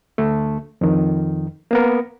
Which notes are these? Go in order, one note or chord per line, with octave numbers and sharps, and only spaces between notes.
D2 A3
F2 D#3
A#3 B3 A#4